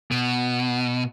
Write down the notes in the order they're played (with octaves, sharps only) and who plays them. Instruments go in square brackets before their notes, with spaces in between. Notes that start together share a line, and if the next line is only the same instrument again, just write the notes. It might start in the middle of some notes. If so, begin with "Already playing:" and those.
[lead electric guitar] B2